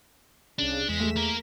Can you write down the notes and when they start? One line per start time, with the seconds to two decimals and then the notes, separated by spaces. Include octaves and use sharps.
0.58 C2 C#3 D4
0.89 E2 G#3 B6 E7
1.00 A3 G#4
1.16 A#3 A#4